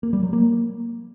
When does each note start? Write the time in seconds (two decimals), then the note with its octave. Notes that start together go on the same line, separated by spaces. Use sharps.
0.03 A#3
0.13 G3
0.23 F#3
0.33 A#3